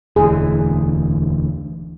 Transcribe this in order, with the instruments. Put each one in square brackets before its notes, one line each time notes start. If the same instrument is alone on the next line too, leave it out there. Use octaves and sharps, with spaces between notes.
[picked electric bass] E1 D2 E3 [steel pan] G#4